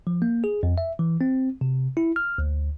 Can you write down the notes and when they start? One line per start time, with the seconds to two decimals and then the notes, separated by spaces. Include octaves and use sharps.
0.07 F3
0.22 A#3
0.44 G#4
0.63 F2
0.78 E5
0.99 E3
1.21 C4
1.61 C3
1.97 E4
2.16 F6
2.38 D2